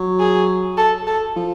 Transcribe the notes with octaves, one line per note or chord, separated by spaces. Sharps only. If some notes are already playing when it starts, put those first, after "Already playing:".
Already playing: F#3
G#4
A4
A4
F3